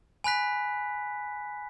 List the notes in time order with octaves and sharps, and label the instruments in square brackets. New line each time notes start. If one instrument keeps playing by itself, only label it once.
[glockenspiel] G#5 B5 F#6 B6